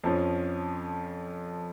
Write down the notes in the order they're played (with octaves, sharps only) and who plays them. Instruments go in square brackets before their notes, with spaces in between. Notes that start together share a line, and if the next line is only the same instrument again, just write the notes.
[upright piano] F2 F3 C#4